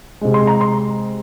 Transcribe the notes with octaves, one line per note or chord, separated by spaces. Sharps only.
C3 G#3
C6
A#5
C6